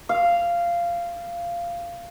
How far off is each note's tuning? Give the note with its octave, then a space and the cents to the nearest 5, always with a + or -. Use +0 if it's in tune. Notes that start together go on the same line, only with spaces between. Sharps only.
F5 -15